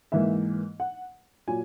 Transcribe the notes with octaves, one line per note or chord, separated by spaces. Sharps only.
G#2 E3 A#3 E5
F#5
A#2 F#3 G#5